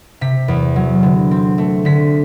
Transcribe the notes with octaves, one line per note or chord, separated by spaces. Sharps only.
C3 B6
E2
F#3
D3
C4
A3
D3 B6